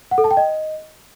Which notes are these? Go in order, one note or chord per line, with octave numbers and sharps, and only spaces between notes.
F#5
A4
A5
G5
D#5